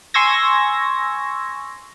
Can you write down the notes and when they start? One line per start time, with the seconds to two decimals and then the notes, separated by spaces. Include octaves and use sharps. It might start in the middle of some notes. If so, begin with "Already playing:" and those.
0.14 G#5 C6 C#6 E6 G#6 A#6